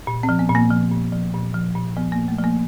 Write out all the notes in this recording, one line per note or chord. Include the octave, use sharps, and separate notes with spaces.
A#2
C4
F3
B3
A#2
A#3
F3
A#2
F3
A#2
F3
A#2
F3 B3
A#3
A#2
A3
F3
A#3